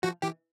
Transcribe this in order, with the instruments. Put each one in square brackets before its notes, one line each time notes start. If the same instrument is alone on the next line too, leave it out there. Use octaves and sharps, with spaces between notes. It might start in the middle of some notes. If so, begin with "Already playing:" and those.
[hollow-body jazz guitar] F3 [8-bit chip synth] F#4
[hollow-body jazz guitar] E3 [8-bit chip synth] G4